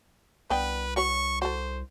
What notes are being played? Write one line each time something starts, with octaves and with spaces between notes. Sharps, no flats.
C2 B3 D4 B4 G5
F#4 B4 C#5 C#6
F#4 A4 C5